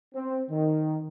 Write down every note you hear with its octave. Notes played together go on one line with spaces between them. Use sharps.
C4
D#3